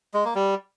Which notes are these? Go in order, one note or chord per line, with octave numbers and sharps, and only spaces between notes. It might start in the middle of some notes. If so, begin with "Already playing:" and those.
G#3
A#3
G3